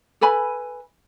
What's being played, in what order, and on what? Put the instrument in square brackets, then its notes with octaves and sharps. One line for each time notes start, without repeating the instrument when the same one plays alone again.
[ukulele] A4 B4 G#5 B5